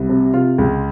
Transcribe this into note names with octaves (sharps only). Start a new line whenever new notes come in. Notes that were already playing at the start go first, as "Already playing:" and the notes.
Already playing: C2
C3
C3 F4
C#2